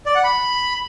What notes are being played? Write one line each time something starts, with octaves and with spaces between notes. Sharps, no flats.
D5
F#5
B5